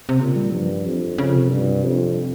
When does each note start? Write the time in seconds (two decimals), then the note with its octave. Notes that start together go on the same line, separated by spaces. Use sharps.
0.09 C3
0.20 A#2 C#3
0.36 G3
0.52 G2 F3
0.69 G3
0.85 F2 F3
1.18 F2 C#3
1.35 C3
1.51 G2
1.84 F2